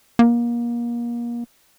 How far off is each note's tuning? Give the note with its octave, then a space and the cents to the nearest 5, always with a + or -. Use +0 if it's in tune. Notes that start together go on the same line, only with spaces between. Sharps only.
A#3 +30